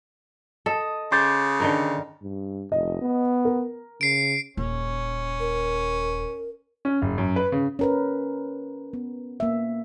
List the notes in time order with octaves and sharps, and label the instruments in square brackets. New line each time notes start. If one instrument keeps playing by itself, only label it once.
[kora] A4 [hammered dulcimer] D#5
[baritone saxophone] C#3 [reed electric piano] C6 G6 A6 [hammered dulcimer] D6
[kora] D3 D#3 A#4
[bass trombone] G2
[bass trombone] F1 [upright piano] D#5
[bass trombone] B3
[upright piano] A#4
[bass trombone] C#3 [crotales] C7 D7
[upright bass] D#1 [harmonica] C#4
[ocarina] A#4
[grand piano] C#4
F#1
F#2
B4
C#3
[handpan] C#4 A#4 B4
B3
A#3 E5